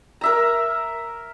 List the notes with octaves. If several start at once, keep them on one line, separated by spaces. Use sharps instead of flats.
A#4 E5 A#5